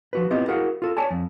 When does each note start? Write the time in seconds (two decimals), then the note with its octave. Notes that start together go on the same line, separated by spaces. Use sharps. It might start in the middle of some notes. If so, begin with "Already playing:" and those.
0.13 F3 F#4 B4
0.30 B3 C4 E4 F4 G4 D#5
0.48 E4 F#4 G#4 A#4 F5 F#5
0.82 F4 A4
0.97 C#5 D5 G#5 A5
1.11 F2